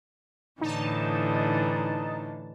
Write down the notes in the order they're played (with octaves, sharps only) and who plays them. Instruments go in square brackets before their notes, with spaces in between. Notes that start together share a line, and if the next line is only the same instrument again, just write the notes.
[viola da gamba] A2 D3 E3 [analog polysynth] D#4 A5